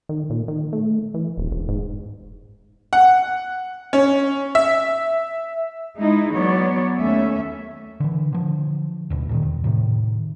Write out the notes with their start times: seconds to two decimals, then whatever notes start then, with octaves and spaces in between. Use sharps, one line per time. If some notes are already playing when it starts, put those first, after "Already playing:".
0.09 D#3
0.30 A#2
0.48 D#3
0.73 A3
1.14 E3
1.37 D#1
1.51 E1
1.69 G#2
2.93 F#5
3.93 C#4
4.55 E5
5.98 G#3 D#4 E4
6.33 F#3 B3 C#5 D5
6.97 D#2 A3 C#4 E5
8.00 D3 E3
8.33 D3 F3
9.10 D#1 D2 B2
9.29 A#2 D3 D#3
9.43 E1
9.64 A2 C3 D#3